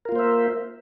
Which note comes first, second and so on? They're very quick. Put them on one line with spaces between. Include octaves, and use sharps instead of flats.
A#4 F4 A#3 C5 E5